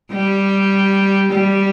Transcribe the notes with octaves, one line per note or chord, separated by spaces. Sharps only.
G3
G3